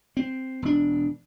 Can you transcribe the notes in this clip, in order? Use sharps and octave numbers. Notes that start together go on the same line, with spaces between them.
C4
E1 D4